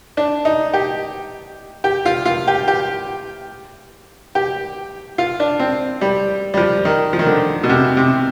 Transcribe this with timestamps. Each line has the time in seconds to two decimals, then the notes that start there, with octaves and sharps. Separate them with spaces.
0.17 D4
0.45 D#4
0.73 G4
1.84 G4
2.06 F4
2.25 F4
2.47 G4
2.68 G4
4.35 G4
5.18 F4
5.40 D4
5.59 C4
6.01 G3
6.54 G3
6.57 F3
6.85 D#3
7.13 F3
7.19 D#3
7.26 D3
7.63 B2
7.69 C3
7.97 C3